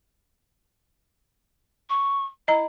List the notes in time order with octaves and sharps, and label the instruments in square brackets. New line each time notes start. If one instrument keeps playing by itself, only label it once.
[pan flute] C#6
[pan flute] E4 [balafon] D#5 A#5